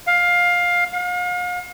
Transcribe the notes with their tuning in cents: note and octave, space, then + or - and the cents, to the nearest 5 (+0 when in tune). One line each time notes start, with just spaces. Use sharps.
F5 +15
F5 +40